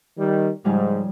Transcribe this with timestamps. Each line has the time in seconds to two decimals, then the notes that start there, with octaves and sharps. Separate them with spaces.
0.18 D#3 G3
0.65 G#2 C#3 F3 G3